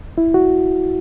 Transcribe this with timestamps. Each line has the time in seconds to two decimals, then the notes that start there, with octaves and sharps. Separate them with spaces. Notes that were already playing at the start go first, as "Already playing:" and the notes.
0.18 E4
0.34 F#4